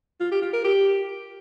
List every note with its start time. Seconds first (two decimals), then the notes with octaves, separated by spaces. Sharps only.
0.20 F4
0.31 G4
0.42 F4
0.53 A#4
0.64 G4